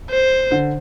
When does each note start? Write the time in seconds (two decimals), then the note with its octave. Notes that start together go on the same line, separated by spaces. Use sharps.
0.11 C5
0.52 D3